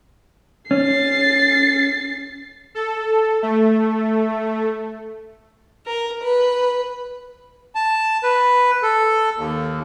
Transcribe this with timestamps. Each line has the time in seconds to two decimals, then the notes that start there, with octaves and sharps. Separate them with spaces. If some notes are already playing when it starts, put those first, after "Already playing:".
0.71 C#4 A6 C7
2.75 A4
3.43 A3
5.87 A#4
6.21 B4
7.75 A5
8.23 B4
8.83 A4
9.37 D#2